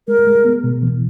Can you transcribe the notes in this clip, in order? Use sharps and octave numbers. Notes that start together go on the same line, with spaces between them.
G#3 A#4
G#3
B3
B2
E3